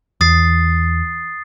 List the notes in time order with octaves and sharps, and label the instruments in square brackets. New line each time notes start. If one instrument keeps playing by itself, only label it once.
[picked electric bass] E2 [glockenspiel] D#6 A6 C7